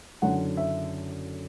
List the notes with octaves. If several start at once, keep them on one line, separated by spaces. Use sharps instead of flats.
F#1 F#2 D3 F#3 F#5
E5